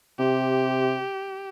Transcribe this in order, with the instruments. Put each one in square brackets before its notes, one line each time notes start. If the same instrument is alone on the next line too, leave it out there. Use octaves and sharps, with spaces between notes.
[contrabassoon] C3 [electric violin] G4